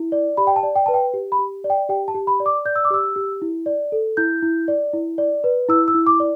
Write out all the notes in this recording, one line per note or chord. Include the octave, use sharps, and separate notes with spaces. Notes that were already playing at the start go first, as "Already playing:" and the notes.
Already playing: E4
D5
G4 B5
G5
A5
D5
G5
B4 A5
G5
G4
B5
G4
D5
G5
G4 G5
A5
G4
B5
D5
D6
D5 G6
E6
D6
G4 E6
G4
E4
D5
A4
E4 G6
E4
D5
E4
D5
B4
E4 E6
E6
E4
D6
D5